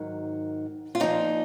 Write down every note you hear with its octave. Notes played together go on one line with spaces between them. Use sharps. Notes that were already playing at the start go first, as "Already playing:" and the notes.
Already playing: G#2 D#3 F#3
F4
A#2 F3 D#4